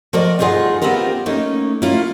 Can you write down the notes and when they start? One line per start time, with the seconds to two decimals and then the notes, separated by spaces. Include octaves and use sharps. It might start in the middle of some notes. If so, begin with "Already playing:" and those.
0.13 F3 F#4 A#4 D5 D#5
0.39 D2 G2 D#4 F4 G#4 F#5
0.82 B3 C4 F4 G4 A#4
1.26 A3 A#3 C#4 D#4
1.82 A#3 C#4 E4 F4